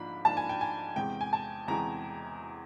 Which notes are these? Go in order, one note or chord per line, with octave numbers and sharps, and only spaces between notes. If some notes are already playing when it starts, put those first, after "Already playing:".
Already playing: G#2 F3 A#3 D4 B5
G#2 F3 A#3 D4 A5
G#5
G5
G#5
E2 C3 E3 G#3 G5
G#5
A5
E2 C3 E3 G#3 A#5